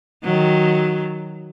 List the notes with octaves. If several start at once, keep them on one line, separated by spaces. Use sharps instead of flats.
D#3 F#3